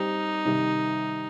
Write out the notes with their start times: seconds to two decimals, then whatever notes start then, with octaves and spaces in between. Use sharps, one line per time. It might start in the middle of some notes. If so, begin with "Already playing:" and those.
Already playing: G3 C4 D#4 G4
0.45 C3 D#3 G3